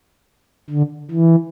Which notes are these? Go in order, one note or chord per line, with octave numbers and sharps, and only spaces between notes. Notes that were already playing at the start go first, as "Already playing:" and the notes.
D3
E3